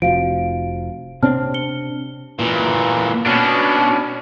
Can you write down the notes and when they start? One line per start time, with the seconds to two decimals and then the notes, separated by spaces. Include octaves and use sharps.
0.02 F1 F3 F#4 F5 D7
1.23 C3 C4 D4 C#5 A5 F6
1.54 C#7 G7
2.40 A#2 E3
3.26 B2 C#4 D4